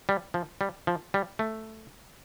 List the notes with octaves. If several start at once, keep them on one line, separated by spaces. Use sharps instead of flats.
G3
F3
G3
F3
G3
A3